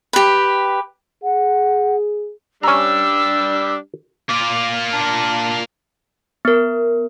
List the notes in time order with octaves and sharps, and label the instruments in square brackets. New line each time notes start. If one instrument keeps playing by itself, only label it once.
[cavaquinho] G4 B4
[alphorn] G#4 [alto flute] F#5
[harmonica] G3 D4 G4 [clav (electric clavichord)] C#4 A#5 [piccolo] E6
[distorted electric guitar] A#3 F4 [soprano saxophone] D6
[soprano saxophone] D4
[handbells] B3 A#4